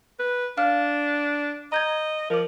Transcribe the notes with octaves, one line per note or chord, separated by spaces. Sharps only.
B4
D4 F5 F6
D#5 A#5 G6 G#6
F3 A#4 D6